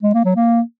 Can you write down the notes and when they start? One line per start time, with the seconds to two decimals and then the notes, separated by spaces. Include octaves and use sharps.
0.03 G#3
0.14 A#3
0.25 F#3
0.36 A#3